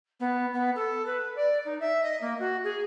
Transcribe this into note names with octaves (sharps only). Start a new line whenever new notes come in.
B3
B3
A4
B4
D5
D#4
E5
D#5
A#3
F#4
G#4